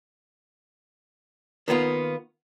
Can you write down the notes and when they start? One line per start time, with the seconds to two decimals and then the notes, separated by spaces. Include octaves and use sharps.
1.68 D#3 A#3 B3 F4